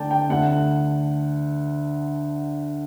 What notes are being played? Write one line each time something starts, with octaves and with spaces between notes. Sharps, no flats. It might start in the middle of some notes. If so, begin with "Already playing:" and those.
Already playing: D2 D3 D5 G5 A5
G5
D2 D3 F#5